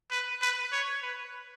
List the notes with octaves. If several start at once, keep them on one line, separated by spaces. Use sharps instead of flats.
B4
B4
C#5
B4